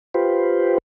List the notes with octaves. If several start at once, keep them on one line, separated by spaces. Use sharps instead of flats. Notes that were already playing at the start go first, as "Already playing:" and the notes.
F4 G4 B4 C5